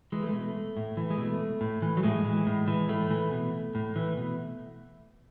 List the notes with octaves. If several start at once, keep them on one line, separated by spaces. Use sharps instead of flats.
E3 G#3
A3
G#3
B2 A3
A2
E3
G#3
B2 A3
A2
E3
F#3
A2 G#3
E3
A2
E3
A2 A3
E3
B2
A2
E3
B2